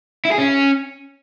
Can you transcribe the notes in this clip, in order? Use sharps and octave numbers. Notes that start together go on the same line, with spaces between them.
E4
G#4
C#4